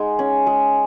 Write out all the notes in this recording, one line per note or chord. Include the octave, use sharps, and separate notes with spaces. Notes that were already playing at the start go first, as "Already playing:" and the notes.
Already playing: G#3 D#4 F#5
C#4
G#3